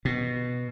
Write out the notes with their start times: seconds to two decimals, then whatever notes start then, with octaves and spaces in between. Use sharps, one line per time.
0.05 B2